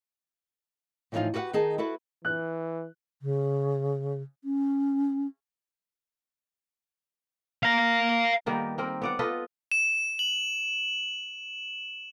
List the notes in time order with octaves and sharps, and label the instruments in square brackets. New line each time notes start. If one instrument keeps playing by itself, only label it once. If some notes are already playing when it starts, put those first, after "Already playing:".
[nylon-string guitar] A2 E3 F3 D4 D#4 F4
F#4 G4 B4 E5 F#5
D#3 D#4 G#4 A5
E4 F#4 A4 B4
[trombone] E3 [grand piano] F#6
[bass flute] C#3
C#4
[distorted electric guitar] F5 A#5
[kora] D#3 G3 A#3 B3
A#3 C4 A#4
B3 D5 F#5
F4 A4 B4 D#5
[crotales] E7
F#7